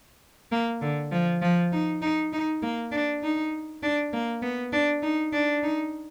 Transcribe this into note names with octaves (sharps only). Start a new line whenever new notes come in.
A#3
D3
F3
F3
D#4
D#4
D#4
A#3
D4
D#4
D4
A#3
B3
D4
D#4
D4
D#4